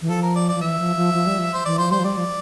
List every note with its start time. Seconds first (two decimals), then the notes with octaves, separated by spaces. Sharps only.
0.02 E3
0.09 F3 A4
0.22 A#4
0.36 D5
0.49 D5
0.55 F3
0.61 E3 E5
0.79 F3
0.96 F3
1.14 F3
1.26 G3
1.39 F3
1.54 C5
1.65 E3 D5
1.78 F3 C5
1.91 G3 C5
2.00 F3
2.04 G3 D5
2.17 F3